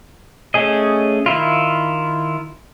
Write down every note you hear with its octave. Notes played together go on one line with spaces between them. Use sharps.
A3 C#4 G#4 D#5
D#3 E4 F4